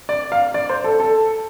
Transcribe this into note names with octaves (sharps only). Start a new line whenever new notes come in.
D5
F5
D5
C5
A4
A4